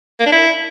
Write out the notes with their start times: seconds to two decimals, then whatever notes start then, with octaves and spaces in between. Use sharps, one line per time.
0.20 A#3
0.26 D4
0.32 E4